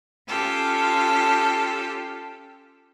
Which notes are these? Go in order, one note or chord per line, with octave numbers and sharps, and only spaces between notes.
C#4 F4 G4 A4